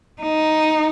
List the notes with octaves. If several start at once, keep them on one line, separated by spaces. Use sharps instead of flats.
D#4